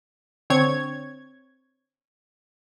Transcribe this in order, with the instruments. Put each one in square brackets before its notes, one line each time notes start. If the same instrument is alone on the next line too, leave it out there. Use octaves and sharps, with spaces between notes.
[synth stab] D3 C4 C#5 G#6